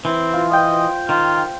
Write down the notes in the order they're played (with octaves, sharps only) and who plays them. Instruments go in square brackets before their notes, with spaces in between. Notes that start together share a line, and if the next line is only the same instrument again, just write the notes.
[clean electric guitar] E3 [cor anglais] C4
[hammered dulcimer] F4
[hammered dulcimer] C5 G5 [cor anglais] D#5
[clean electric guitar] D#3 [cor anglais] F4